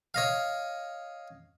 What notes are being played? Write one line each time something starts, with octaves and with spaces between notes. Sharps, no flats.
C#5 D#5 F5